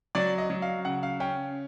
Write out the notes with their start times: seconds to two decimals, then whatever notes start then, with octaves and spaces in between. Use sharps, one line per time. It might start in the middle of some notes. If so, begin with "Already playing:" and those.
0.15 F#3 D5
0.38 D#5
0.50 F#3
0.62 F5
0.85 C#3 F#5
1.03 F5
1.20 C#4 G5